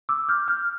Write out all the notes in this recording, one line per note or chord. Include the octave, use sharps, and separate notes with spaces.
D6 E6
F6 G6
F6 G6